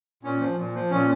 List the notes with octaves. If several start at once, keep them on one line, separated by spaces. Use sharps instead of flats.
A#2 C#4
F3
A#2
F3
A#2 C#4